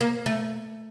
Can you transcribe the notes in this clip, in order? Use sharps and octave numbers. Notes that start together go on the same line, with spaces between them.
A#3
A3